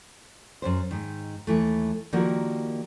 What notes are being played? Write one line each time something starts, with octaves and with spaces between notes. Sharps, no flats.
F#2 A#2 C5
G#2 D#3
D#2 E3 A3
D#3 F3 G3 A#3 F#4